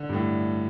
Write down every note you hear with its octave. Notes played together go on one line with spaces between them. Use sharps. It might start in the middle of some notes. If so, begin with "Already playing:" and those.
Already playing: D3
G2
A2